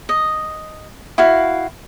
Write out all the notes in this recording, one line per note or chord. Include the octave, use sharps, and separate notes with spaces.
D#5
E4 F#4 F5